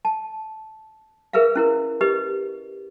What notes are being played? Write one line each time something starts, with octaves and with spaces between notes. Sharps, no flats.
A5
G#4 A#4 B4 E5 F5
C#4 E4 A#4
G4 B4 D#5